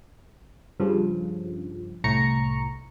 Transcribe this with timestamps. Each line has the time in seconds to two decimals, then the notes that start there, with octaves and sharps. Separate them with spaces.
0.80 G2 C#3 F3
2.04 C2 A2 A#5 C#6 C#7